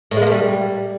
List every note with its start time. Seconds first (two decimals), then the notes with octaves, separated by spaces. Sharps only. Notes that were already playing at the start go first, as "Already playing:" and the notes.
0.11 A2
0.16 G#3
0.22 A#3
0.27 A3
0.32 G3